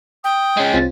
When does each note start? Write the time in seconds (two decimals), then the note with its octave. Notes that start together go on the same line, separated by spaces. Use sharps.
0.24 G5 D#6
0.57 G#3 C#4
0.74 C2 C4 F4 A6